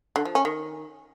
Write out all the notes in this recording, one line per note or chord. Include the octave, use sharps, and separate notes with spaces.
D3
F3
C#4
D#3